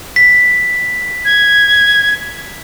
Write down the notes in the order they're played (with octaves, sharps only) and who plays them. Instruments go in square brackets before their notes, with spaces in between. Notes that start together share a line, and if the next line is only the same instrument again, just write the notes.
[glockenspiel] B6
[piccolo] G#6